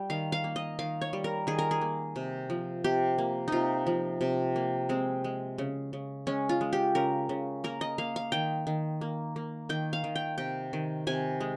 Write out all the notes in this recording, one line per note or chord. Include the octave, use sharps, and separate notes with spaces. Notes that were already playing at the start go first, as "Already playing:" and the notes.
Already playing: G3 G5
D#3 F5
F5
A#3
D#5
D#3 F5
C#5
G3
A#4
D#3 G#4
A#4
G#4
A#3
C3
F3
C3 G4
A#3
C3 D#4 F4
F3
C3
A#3
G#3 C4
G#3
C#3
C#3
G#3 C#4
F4
G#3
G4
C#3 A#4
C#3
A#3 A#4
D#5
A#3 F5
F5
D#3 G5
D#3
A#3
A#3
D#3 G5
F5
D#3
G5
C3 G5
D#3
C3 G#5
G#3